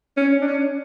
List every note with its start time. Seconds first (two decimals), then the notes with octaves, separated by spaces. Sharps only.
0.17 C#4
0.41 D4
0.47 C#4